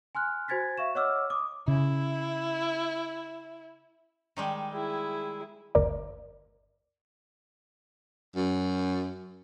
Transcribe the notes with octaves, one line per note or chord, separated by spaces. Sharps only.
G#5 C6 F6 F#6
F#4 C5 G#5 G#6 A6 B6
E5 F5 C#6 E7
C#5 D#5 F#5 D6 E6 F6
D6 D#6
C#3 E4
D#3 G3 G#3
E4 G#4
G1 D2 A#4 D5
F#2